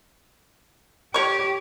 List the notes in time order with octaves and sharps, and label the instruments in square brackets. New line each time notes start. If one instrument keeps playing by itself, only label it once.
[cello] G4 [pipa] C#5 C#6